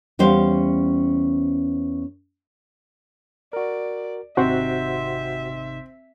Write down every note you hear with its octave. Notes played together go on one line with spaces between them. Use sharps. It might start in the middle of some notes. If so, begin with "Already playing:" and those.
E2 G3 C#4 C5 F5
F#4 A#4 D5
G#1 C3 C4 D#4 F#4 C5 E5 F#5